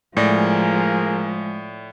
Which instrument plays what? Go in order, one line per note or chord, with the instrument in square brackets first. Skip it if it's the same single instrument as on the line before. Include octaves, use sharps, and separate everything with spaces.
[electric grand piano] A2 D5 A#6 [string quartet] F3 [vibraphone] G#3 [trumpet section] A#3 G#4 A#4